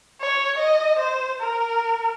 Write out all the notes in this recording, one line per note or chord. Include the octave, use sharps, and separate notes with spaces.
C#5
D#5
C5
A#4